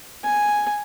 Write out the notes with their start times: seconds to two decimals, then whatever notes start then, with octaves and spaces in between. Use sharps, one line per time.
0.24 G#5